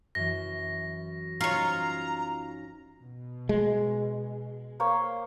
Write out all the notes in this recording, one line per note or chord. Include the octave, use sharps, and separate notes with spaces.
F#2 E3 A#6
C#4 D#4 F4 C5 C#5 A#5
B2
G#3
A#3 C5 C#5